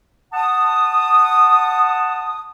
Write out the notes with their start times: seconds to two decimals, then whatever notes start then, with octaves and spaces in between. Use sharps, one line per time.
0.33 F#5 A5 D#6